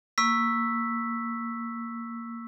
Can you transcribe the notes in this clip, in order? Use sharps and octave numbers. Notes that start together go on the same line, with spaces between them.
A#3 C#6 E6 B6